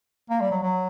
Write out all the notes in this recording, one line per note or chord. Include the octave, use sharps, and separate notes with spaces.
A#3
G3
F#3
F#3